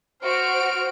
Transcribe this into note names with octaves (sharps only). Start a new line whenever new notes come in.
F#4 C5 F6 D7